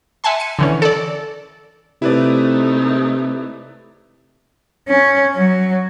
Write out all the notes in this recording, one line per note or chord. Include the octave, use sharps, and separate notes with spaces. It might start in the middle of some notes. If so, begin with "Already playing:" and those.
E5 F#5 G#5 A5 C6
C#7 D#7
D3 E3 C#4
A4 D5
C3 A3 D#4 E4 B4 D5
C#4
F#3